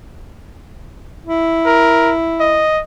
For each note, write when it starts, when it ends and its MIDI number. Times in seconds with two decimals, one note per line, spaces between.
1.25 2.66 64
1.66 2.12 70
2.40 2.81 75